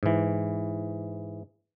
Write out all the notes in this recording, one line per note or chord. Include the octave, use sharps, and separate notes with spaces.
G#2 E3